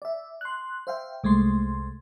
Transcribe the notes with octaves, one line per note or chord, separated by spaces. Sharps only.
D5 E5
C6 F#6
C5 E5 F5 G5
C2 G#3 A3 C6